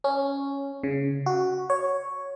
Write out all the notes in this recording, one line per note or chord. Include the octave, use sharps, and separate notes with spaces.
C#4
C#3
F#4
C#5